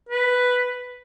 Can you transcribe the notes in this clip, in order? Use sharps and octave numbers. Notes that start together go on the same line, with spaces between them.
B4